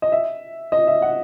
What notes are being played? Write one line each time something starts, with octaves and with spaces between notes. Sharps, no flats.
D#5
E5
D#5
E5
F#5